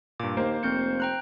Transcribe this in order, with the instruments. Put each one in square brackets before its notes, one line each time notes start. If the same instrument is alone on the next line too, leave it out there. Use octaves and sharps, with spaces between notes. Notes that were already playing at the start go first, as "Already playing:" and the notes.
[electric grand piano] G2 A#2 [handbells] D6
[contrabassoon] D#2 [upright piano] A#3 [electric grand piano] C5
[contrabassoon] F1 [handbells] C4 G6 C#7
[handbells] G5 A#5 F#6